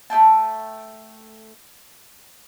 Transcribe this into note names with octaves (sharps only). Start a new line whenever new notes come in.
A3 D#4 G5 A5